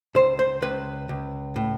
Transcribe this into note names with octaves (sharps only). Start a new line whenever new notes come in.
C#2 C5
C5
C#2 B4
C#2
A2